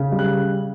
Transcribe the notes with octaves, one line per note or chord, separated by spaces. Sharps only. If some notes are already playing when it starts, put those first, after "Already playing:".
Already playing: C#3
G3
F#6